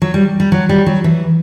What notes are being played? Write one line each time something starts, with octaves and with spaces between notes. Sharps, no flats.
F#3
G3
G3
F#3
G3
F#3
E3